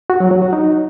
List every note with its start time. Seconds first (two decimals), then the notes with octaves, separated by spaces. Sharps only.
0.10 F#4
0.20 F#3
0.31 F#3
0.42 F#4
0.53 D#4